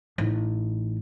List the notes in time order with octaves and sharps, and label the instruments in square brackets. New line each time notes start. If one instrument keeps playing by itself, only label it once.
[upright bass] A1 D#4